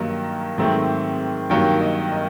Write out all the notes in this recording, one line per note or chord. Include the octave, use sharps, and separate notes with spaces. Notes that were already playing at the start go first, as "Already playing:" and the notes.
Already playing: G2 D#3 F#3 A#3 D#4
G#2 D#3 F#3 A3 C4
G2 D#3 F#3 A#3 G5
D#5
D#5